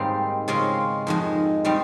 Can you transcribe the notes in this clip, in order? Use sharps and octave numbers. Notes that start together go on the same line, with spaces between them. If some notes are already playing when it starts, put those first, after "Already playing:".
Already playing: G#2 D#3 G3 A#3 C4
C#3 G#3 C4 F4
F2 D#3 G#3
D#3 G3 C4